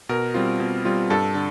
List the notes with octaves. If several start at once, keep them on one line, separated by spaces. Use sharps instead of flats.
B2 A#4
G3 C4 F4
B2
G3 C4 F4
G2 A4
D3